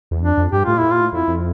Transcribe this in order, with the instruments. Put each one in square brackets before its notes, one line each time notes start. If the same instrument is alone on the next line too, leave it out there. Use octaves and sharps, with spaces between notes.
[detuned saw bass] E2
[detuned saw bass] F2 [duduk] D4
[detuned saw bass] F2
[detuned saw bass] G2 [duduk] G4
[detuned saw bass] A2 [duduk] F4
[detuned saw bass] A#2 [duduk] E4
[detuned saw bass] A2
[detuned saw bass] A#2 [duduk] F4
[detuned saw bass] A2
[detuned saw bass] F2 [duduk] E4
[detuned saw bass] F2